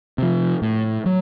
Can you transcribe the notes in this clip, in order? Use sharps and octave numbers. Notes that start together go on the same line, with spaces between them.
C3 F3
A2
F#3